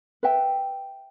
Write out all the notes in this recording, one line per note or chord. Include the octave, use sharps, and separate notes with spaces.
B4 E5 G5